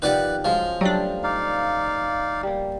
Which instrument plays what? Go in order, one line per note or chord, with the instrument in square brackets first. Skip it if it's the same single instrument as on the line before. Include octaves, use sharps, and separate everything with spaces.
[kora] D#3 F3 G4 [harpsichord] B4 D5 F#5
[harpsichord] F3 [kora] F#3 G#3 C#4
[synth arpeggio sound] F#3 D4 [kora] G3 A3
[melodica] D#4 D5 F5
[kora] G3 A#3